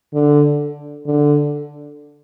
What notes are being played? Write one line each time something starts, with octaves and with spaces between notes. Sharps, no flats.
D3
D3